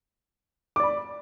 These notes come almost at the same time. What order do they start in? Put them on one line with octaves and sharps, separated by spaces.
D6 D5 B5